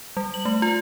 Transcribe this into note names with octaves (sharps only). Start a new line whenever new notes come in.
G3
F#7
A3
F4